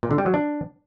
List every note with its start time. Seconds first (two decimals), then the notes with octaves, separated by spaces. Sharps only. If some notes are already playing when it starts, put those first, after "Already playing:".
0.03 A#2
0.11 D3
0.18 G3
0.26 F#3
0.34 D4